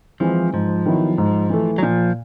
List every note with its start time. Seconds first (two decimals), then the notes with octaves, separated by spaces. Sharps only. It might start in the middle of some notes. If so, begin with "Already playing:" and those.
0.20 E3 F3 G#3 C4 E4
0.53 G#2 F3
0.86 D#3 F#3 B3 E4
1.18 G#2
1.50 E3 A3
1.78 F#3
1.83 A#2 F3